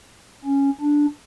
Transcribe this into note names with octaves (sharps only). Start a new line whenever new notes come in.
C#4
D4